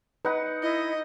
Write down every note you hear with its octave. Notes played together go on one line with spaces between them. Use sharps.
D#4 B4 F#5
E4 D#5